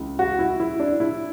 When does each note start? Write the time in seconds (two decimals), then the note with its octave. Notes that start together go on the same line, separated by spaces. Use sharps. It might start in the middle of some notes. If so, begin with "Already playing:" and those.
Already playing: C#2 C#3 E3
0.19 F#4
0.39 E4
0.60 E4
0.80 D4
1.00 E4